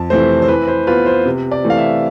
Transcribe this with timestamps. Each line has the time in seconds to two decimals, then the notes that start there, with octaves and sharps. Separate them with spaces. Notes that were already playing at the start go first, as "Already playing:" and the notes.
Already playing: F2 A5
0.10 C3 E3 A3 C4 C5
0.42 C5
0.48 E3 B4
0.68 C5
0.87 B3 F4 B4
1.06 C5
1.25 C3
1.52 D5
1.64 E3 A3
1.70 F5
1.77 E5